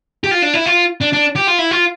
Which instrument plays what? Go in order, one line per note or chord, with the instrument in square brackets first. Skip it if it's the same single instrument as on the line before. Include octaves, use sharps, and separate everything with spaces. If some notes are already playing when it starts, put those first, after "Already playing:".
[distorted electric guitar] G4
F4
D4
E4
F4
D4
D4
G4
F4
E4
F4